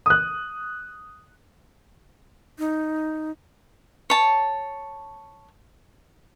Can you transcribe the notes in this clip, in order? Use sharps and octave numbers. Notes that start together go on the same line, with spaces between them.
D#6 F#6
D#4
C#5 A5